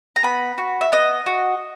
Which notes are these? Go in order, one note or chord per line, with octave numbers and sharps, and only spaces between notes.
A#5
B3 B5
F#4
E5
B3 D#5
F#4